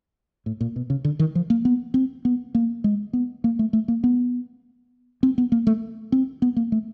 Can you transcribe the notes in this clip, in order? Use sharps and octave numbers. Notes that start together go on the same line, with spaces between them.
A2
A#2
B2
C#3
D3
D#3
F3
A#3
B3
C4
B3
A#3
G#3
B3
A#3
A3
A3
A#3
B3
C4
B3
A#3
A3
C4
B3
A#3
A3